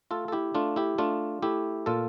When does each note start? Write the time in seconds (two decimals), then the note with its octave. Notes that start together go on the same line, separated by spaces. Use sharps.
0.11 A3 F4 A4
0.28 A4
0.32 E4 G4
0.55 A3 D4 F4
0.76 E4 G4
0.98 A3 D4 F4
1.42 A3 E4 G4
1.86 A#2 F4 A4